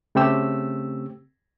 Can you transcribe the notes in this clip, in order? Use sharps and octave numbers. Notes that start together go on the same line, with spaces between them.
C#3 A3 C4 G4 E6